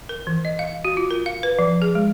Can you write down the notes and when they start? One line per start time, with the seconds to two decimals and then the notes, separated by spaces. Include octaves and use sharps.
0.09 A#4
0.27 E3
0.45 D#5
0.59 F5
0.85 F#4
0.97 F4
1.11 A#4
1.26 F5
1.43 B4
1.59 F3
1.82 G#4
1.95 G#3